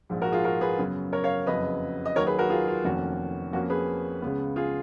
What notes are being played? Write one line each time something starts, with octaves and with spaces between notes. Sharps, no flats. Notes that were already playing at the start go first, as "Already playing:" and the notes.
A#1 G#2 F3
F#4 A#4
F4 G#4
F#4 A#4
G#4 B4
F#2 C#3 F#3 B3
A#4 C#5
C#5 F5
F#1 F2 C#3 F#3 B4 D#5
D#5
D#2 D#3 F#3 A#4 C#5
G#4 B4
F#4 A#4
F4 G#4
F4
F1 F2 D#3 A#3 C#4 F#4
F2 F3 A#3 C#4 F#4
G#4 B4
C#2 C#3 G#3 B3
F4 G#4